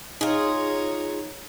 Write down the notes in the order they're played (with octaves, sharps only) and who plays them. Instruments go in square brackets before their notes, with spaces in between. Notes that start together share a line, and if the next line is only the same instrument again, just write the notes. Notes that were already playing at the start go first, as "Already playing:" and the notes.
[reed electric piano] D#4 [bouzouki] F4 G#4 [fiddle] C#5 A#5